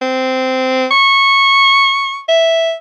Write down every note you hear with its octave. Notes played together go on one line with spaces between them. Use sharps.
C4
C#6
E5